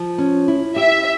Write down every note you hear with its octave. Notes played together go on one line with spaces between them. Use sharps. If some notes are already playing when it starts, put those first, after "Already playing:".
Already playing: F3
C#4
E4
G4 E5